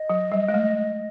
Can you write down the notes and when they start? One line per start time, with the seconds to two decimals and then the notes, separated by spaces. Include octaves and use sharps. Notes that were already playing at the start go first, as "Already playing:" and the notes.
Already playing: D#5
0.10 F#3
0.32 G3
0.48 G#3
0.54 A3